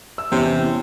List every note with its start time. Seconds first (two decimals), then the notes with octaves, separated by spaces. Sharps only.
0.18 E6
0.32 E2 C3 C#4